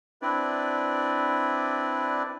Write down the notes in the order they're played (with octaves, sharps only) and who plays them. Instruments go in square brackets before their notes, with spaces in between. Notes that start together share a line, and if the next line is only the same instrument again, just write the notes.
[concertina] C4 D4 E4 B4 D5